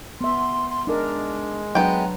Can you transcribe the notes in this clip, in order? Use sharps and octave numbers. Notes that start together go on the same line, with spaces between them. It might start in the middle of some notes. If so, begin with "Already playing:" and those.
B3 E5 C6
C6
G#3 D4 D#4 A#4
F#3 B3 D4 B4 G5 A#5